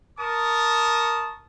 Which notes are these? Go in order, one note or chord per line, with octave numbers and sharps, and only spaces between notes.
A#4 A5 C#6 D#6